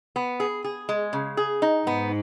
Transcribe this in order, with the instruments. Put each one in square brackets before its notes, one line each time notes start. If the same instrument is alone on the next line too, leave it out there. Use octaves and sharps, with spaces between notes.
[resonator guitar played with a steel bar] B3
G#4
G#4
G#3
C#3
G#4
D#4
[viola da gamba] G#2 [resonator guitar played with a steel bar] B3